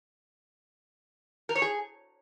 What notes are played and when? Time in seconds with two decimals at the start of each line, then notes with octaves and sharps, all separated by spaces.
1.49 A#4
1.55 C#5
1.62 G#4